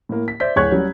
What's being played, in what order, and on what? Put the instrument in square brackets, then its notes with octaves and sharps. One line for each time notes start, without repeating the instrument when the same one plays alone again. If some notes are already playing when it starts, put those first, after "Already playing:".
[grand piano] A2 A#3
B6
C5 D5 E5 G6 B6
D1 G#4 C#5 C#6 F#6 G#6
F#3 G3 C#4